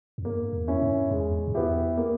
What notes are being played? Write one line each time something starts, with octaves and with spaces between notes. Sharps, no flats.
E2
G2 A#3
E2
C#4 E4
G2
E2 G#3
G2
E2 B3 E4 G4
A#3